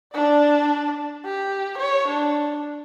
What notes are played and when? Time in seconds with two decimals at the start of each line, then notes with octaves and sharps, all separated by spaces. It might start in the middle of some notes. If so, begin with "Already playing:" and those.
0.15 D4 D5
1.25 G4
1.78 C#5
2.08 D4